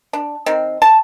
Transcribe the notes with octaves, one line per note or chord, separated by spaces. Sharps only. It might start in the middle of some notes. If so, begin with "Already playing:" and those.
D4
D#3 C4
A5